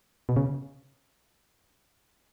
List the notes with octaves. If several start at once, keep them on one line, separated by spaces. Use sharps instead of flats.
B2
C#3